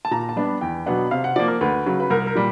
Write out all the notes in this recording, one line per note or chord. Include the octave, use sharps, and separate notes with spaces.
A5
A#2 A#5
A5
G3 B3 D4
E2 G5
B2 F#3 B3 D4 F#5
C3 F5
F#5
F3 A#3 D5
A#4
D2 B4
C#3 F#3
B4
C2 A#4
A#4
A#2 G3